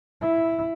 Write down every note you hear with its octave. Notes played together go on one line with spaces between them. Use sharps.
E4